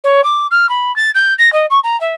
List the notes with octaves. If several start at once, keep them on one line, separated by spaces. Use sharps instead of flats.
C#5
D6
F6
B5
A6
G6
A#6
D#5
C#6
A#5
E5